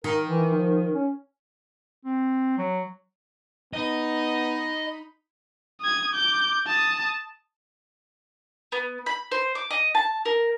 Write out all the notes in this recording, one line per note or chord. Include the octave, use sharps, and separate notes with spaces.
D#3 A#4
E3
F3
C#4
C4
F#3
B3 D#4 D#5 B5
D#6 G#6
D6 G6
A5 D#6
B3
B5
C5
D6
D#5
A5
A#4